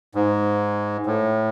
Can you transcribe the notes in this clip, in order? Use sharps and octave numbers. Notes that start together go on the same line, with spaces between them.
G#2
A2